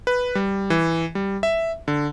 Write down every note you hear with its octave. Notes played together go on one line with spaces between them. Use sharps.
B4
G3
E3
G3
E5
D3